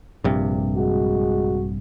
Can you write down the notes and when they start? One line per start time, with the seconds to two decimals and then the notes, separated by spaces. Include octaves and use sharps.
0.24 A#1 G2 C3
0.76 G#3 F#4